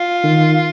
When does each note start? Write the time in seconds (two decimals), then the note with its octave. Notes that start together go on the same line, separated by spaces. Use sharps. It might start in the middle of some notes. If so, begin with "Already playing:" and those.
Already playing: F4
0.23 D#3